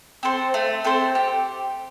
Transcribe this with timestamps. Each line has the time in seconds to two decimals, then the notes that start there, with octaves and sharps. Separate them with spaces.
0.23 C4 A4 C5
0.54 A3
0.84 C4 A4 C5
1.15 G4